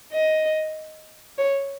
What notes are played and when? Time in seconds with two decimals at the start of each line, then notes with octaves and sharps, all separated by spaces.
0.12 D#5
1.38 C#5